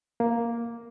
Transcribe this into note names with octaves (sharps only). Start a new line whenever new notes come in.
A#3